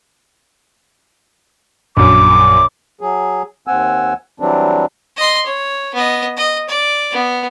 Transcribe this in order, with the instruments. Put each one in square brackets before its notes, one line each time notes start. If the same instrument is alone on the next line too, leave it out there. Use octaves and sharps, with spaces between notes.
[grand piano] A#1 F#2 [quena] D6
[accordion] F#3 G#4
D#2 C4 F#5 G#5 E6
E3 F#3 G3 C4 D4
[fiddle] D#5 C6
C#5
B3 D#5
D#5
D5
B3